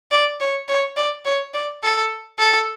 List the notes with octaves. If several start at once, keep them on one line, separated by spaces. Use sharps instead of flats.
D5
C#5
C#5
D5
C#5
D5
A4
A4